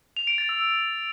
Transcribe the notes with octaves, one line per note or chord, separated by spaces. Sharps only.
F7
D7
A6
E6